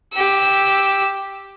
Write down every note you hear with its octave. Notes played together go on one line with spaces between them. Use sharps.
G4 E6